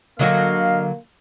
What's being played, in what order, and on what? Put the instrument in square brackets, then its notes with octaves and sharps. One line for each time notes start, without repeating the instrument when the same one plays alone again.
[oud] D3 F#3 F#4 [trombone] A#3 [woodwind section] D#5 F5